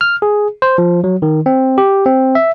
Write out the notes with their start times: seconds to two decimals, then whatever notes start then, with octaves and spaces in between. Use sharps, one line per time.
0.01 F6
0.22 G#4
0.62 C5
0.78 F3
1.04 F#3
1.22 D#3
1.46 C4
1.78 G4
2.06 C4
2.35 E5